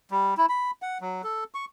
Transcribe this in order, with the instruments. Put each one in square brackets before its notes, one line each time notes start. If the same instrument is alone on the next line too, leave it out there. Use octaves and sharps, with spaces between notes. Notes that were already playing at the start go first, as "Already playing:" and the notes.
[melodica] G3
E4
B5
F#5
F#3
A4
C#6